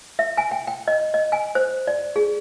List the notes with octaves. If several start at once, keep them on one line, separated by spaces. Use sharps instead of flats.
E5
G#5
G5
G5
D#5
D#5
G#5
C5
D5
G#4